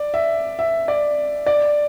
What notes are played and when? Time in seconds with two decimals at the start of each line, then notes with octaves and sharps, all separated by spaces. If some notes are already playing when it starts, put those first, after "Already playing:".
Already playing: D5
0.14 E5
0.59 E5
0.88 D5
1.46 D5